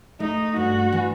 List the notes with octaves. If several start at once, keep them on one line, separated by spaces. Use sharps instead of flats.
A3 D#4
G2 F#4
E3